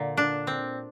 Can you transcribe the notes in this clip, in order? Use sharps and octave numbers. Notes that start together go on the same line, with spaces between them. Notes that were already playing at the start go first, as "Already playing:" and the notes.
Already playing: A#2 D3
D4
C4